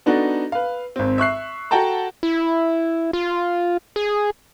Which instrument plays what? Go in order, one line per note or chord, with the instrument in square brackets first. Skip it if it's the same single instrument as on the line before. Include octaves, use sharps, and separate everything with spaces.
[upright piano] B3 D4 D#4 F#4 A4
B4 F5
G#1 C4
E5 C#6 F#6 C7
F#4 A4 F#5 G5 A5 A#5
[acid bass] E4
F4
G#4